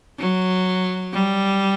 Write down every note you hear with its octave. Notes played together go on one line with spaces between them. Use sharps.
F#3
G3